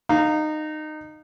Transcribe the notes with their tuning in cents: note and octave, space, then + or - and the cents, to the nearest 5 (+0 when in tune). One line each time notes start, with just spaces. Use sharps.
D#4 -20 F5 +0